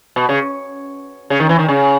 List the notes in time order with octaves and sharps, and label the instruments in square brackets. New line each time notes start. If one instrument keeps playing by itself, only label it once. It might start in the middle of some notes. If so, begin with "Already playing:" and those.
[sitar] B2
C#3
C#3
D#3
E3
D#3
C#3